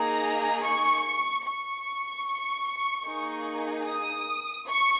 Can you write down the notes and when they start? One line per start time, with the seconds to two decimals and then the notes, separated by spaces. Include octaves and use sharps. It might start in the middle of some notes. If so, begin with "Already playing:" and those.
Already playing: A#3 D#4 G#4 A#5
0.64 C#6
1.45 C#6
3.06 A#3 D#4 G#4
3.86 D#6
4.67 C#6